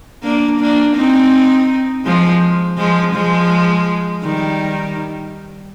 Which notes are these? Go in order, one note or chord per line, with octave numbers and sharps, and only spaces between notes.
A#3 D4
A#3 D4
C4 D#4
F3 G#3
F3 G#3
F3 G#3
D#3 G3